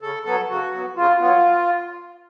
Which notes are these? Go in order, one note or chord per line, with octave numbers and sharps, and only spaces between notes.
C#3 A4
F#3 B3 A4
C#3 F#4
F#3 B3
C#3 F4
F#3 B3 F4